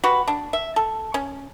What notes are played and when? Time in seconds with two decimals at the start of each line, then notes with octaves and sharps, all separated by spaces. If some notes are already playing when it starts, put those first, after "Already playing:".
0.04 F#4 G4 B4
0.28 D4
0.53 E5
0.76 A4
1.14 C#4